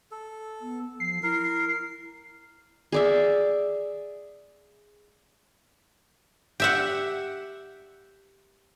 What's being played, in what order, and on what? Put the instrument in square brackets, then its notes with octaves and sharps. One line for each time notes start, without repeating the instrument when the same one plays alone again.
[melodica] A4
[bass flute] B3
[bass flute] F3 [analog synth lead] C7
[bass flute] E4 [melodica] A#4
[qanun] G#4 D5 E5
[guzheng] G4 E5 F#5